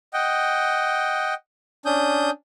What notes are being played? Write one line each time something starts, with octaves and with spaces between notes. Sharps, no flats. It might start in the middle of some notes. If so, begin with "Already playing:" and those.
D#5 F#5 G5
C#4 D4 D#6 G6